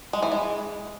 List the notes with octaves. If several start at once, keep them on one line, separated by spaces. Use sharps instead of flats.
G#3
E3
G#3